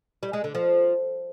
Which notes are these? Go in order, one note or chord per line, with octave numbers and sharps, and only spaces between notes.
G3
G#3
D3
F3